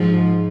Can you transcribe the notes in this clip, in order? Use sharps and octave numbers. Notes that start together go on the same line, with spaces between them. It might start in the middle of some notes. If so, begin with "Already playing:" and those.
Already playing: G#2 F3